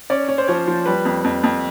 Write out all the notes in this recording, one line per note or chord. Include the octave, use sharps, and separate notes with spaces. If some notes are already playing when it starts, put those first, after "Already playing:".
C#4 D5
C#4
C5
F3 C#5
F3
G3 B4
F2
F2
F2